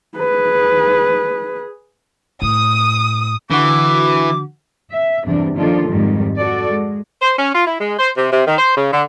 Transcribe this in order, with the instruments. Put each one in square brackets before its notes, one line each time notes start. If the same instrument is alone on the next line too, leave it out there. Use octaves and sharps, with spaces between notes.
[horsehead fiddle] G#4 B4
[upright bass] A2 [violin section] D#6
[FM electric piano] D3 F#4 [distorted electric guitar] E3 [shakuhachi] D6
[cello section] E5
E2 G2 C3 G3 D4
D#3 F3 A#3 D4 F4 A4
F2 G#2 D#3 G3 G#3
F#4 A4 D5
G#3
[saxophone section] C5
C#4
F4
E4
G#3
C5
C3
C3
D#3
C5
C#3
D3